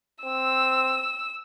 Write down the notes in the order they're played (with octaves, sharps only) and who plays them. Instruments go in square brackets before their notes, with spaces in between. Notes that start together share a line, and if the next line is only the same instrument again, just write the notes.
[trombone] C4 [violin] E6